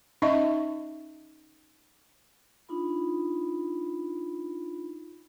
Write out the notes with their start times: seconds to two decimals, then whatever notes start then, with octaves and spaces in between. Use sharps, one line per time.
0.22 C#4 D#4 D#5 E5 C#6
2.69 D4 D#4 F4 B5